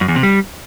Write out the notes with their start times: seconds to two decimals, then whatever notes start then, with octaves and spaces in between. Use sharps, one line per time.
0.01 F#2
0.08 E2
0.16 C3
0.23 G3